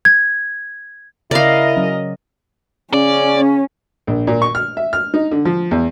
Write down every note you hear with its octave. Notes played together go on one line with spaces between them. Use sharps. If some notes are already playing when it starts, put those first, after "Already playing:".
G#6
C#3 E4 A#4 D5 D#5 F5
F#3 C#4
C#3 C#4 D5
A#1
A#2
C#6
F6
E5
F6
D#4
D3
F3
E2